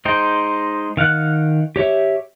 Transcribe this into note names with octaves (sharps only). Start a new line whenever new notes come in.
G#3 D#4 C5 G5
D#3 F5 F#5 F#6
G4 C#5 E5